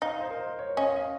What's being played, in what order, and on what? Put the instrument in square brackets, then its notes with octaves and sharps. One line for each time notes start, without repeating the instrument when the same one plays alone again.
[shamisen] D#4 [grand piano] F5
[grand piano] D#5
C5
A#4
C5
C#5
[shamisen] C#4 [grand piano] D#5
[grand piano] F5
D#5